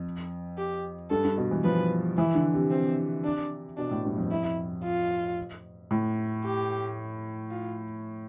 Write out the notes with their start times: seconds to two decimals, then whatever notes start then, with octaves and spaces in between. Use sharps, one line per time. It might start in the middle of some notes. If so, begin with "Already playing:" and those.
Already playing: F2
0.58 G4
1.10 G2 A4
1.24 G2
1.38 B2
1.51 E3
1.64 F3 B4
2.18 E3 E4
2.35 D3
2.54 C3
2.71 C4
3.25 D4
3.77 B2 D4
3.91 A2
4.05 G2
4.18 F2
4.31 E4
4.84 F4
5.91 A2
6.44 G4
7.51 F4